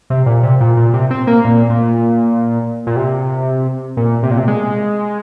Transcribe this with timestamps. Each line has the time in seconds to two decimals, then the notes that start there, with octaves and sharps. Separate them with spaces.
0.10 C3
0.26 A#2
0.43 C3
0.61 A#2
0.77 A#2
0.93 C3
1.10 C4
1.27 A#3
1.45 A#2
1.70 A#2
2.87 A#2
2.96 C3
3.97 A#2
4.23 C3
4.31 A#2
4.38 C3
4.48 G#3